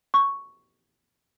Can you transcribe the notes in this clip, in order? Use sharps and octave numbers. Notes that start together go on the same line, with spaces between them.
C#6